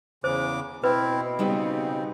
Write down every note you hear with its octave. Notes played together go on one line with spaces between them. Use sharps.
E2 C#3 C5 D6
B2 C4 E4 B4
C#3 G3 B3 C4 D#4